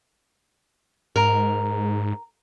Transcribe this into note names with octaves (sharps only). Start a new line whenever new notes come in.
G#2 A#4